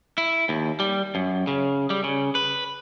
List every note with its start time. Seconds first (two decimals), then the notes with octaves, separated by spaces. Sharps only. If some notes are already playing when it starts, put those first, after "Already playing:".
0.18 E4
0.49 D#2
0.80 G3
1.15 F#2
1.47 C#3
1.90 G3
2.04 C#3
2.35 B4